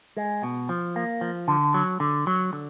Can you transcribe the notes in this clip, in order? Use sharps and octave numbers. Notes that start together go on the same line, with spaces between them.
G#3
B2
F3
A#3
F3
D3
F#3
D3
F#3
D3